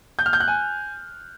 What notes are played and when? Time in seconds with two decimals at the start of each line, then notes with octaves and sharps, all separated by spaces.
0.19 G6
0.26 F6
0.33 G6
0.40 F#6
0.48 G#5